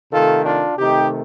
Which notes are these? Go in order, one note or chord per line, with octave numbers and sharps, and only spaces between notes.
C3 D#3 A3 F4 A4
D4 F4
C3 D#3 A3 D#4 G4